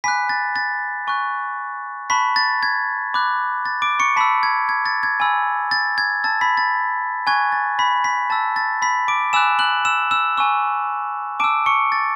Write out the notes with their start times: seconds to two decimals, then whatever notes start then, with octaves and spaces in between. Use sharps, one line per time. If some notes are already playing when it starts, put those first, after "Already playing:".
0.04 G#5 B5 D6 F#6 B6
0.29 A6
0.56 A6
1.07 G#5 C#6 F#6
2.10 A5 B5 C#6 F#6 B6
2.36 A6
2.63 G#6
3.14 B5 D6 F#6
3.65 A6
3.82 D6 D7
3.99 C#6 C#7
4.16 A5 B5 E6 B6
4.43 G#6
4.69 G#6
4.86 A6
5.03 G#6
5.20 G#5 B5 E6
5.71 A6
5.98 G#6
6.24 A5 E6 A6
6.41 B5 B6
6.57 A6
7.27 G#5 C#6 F#6 G#6
7.52 A6
7.79 B5 B6
8.04 B5 B6
8.30 A5 E6 A6
8.56 A6
8.82 B5 B6
9.08 D6 D7
9.33 G#5 B5 D6 E6 F#6 E7
9.59 F#6 F#7
9.85 E6 E7
10.11 E6 E7
10.37 G#5 C#6 E6
11.40 A5 D6 E6 D7
11.66 C#6 C#7
11.92 A6